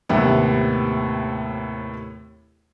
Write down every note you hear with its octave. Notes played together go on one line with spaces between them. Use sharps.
D#2 A2 C3 B3